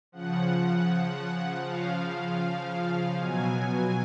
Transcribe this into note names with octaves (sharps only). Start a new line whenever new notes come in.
C#3 F3 F#5
C#3 F3 F5
B2 F#3 G#5